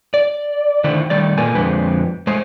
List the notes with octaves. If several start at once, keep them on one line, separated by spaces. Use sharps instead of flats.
D5
D3 D#3 A3 E4 C5
D#3 G3 A3 D5
A#2 A#3 A4 B4 G#5
F2 D3 G#3 B4 C5
G#3 A3 C5